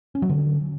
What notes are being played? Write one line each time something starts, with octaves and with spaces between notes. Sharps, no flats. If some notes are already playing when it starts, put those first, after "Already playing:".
C#4
F#3
D3